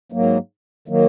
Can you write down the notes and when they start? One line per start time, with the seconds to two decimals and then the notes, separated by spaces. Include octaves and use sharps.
0.12 G#2 F#3 A#3
0.88 D#3 F#3 A#3